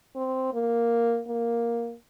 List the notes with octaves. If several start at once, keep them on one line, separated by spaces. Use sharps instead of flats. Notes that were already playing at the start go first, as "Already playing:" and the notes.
C4
A#3
A#3